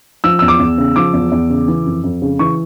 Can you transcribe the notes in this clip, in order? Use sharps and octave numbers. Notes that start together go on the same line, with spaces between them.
F3 E6
E2 E6
D6
E2
C#3
F3 D6
E2
E2
C#3
E3
F2
F2
C#3
E3 C#6